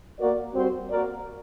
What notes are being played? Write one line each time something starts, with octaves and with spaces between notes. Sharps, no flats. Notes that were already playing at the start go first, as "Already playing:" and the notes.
A#3 F#4 A#4 D5
G3 C4 F#4 C5
A#3 F#4 A#4 D5